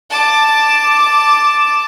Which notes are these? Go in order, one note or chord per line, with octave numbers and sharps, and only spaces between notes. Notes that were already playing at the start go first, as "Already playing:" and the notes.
A5 D6